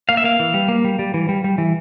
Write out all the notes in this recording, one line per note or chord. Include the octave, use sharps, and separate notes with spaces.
A#3 F5
E5
A#3 F5
E3
G3
A#3
G3
G3
E3
G3
G3
E3